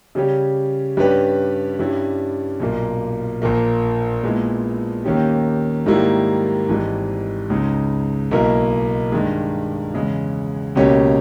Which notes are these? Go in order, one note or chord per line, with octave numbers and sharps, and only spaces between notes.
C#3 G3 C#4 G4
G2 G3 C#4 G4 B4
G2 G3 C#4 E4
B1 A#2 A#3
A#1 A#2 A#3
A#2 G#3 B3 E4
D#2 D#3 A#3 C#4 G4
G#2 D#3 G3 A#3 E4
G#1 G#2 E3 G3
C#2 C#3 G#3 D#4
B1 B2 A#3 E4 A#4
G2 D#3 G#3
E2 C#3 G#3
C#2 B2 A#3 C#4 G4